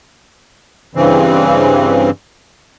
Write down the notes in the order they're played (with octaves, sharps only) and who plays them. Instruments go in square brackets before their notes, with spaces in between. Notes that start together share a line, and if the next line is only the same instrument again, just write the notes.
[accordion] G2 C#3 E3 C4